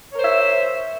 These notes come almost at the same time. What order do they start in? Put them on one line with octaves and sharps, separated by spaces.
C#5 A#4 C5 E5